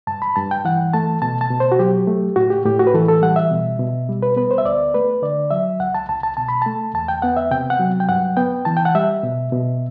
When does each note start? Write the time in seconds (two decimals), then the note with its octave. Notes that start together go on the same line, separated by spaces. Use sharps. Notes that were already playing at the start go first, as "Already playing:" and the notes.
0.07 G2 A5
0.22 B5
0.36 G2 A5
0.51 G5
0.65 E3 F#5
0.94 A3 A5
1.22 B2 A5
1.41 A5
1.50 B2
1.60 C5
1.72 F#4
1.79 F#3 G4
2.07 A3
2.36 A2 F#4
2.50 G4
2.65 A2 G4
2.79 F#4
2.87 B4
2.94 E3 A4
3.08 A4
3.22 G3 F#5
3.36 E5
3.51 B2
3.79 B2
4.09 G3
4.23 B4
4.36 B3 B4
4.51 C5
4.58 E5
4.65 D2 D5
4.94 A3 B4
5.22 D3 D5
5.51 F#3 E5
5.80 C2 F#5
5.95 A5
6.09 C2 A5
6.23 A5
6.37 B2 A5
6.49 B5
6.62 A3 A5
6.94 E2 A5
7.08 G5
7.22 B3 F#5
7.37 E5
7.51 C3 G5
7.70 F#5
7.79 F#3
8.00 G5
8.09 G2 F#5
8.37 B3 G5
8.65 E3 A5
8.77 G5
8.85 F#5
8.95 G3 E5
9.23 B2
9.52 B2